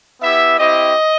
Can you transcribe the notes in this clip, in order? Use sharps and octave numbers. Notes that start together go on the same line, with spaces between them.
B3 E4 G4 E5
C4 E4 G4 D#5